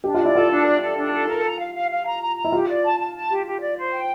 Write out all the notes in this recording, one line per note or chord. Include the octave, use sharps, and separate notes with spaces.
D4 G4
F4
E4 D5
F4 A4
D4
D5
A4
D4
A4
A#4
A#5
F5
F5
F5
A#5
A#5
A#5
E4
F4 G4
D5
A5
A5
A5
G4
G4
D5
C5
G5